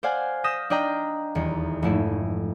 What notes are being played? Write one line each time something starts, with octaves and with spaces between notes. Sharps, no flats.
C5 D5 F5 F#5 G#5
D#6 F6 G6 A#6 B6 E7
D4 D5 D#5 G5 A#5
D#1 E2
F1 G#2 A3 E4